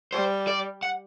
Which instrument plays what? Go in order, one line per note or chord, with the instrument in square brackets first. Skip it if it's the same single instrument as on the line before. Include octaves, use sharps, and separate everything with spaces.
[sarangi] G3 [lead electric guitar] C5
[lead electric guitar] D5
F#5